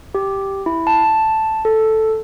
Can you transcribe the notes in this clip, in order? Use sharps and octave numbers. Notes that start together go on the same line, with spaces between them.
G4
E4
A5
A4